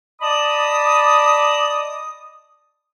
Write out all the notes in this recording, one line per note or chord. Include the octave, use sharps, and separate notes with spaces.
D5 D#5 A5 B5 D6 D#6